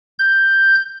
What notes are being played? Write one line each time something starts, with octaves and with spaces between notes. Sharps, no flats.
G6